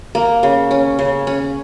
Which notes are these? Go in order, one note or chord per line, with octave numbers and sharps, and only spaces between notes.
A#3
C#3
C#4
C#3
C#4